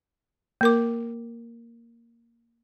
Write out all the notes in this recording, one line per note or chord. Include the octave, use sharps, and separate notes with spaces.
A#3 A#4 D6